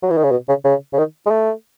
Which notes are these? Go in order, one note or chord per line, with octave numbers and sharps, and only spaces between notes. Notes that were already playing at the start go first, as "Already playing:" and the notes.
F#3
E3
D#3
C#3
B2
C#3
C#3
C#3
D#3
G#3
A3